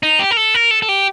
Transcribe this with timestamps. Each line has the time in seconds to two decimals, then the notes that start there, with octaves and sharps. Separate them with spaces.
0.03 D#4
0.19 G4
0.31 A#4
0.37 A4
0.54 A#4
0.71 A4
0.82 A4
0.89 G4